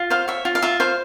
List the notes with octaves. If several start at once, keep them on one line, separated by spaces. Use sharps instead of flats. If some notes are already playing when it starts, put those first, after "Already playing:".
Already playing: F4
C5 F5
C#5 E5
F4
F5
F4 E5
C5 F5